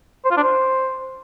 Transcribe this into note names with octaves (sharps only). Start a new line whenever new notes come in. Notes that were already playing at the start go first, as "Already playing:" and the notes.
C5
F4
D4
C5